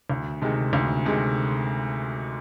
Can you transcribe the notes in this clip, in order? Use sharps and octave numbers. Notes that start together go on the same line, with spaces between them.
D2
C3 D#3 G#3
D2
C3 D#3 G#3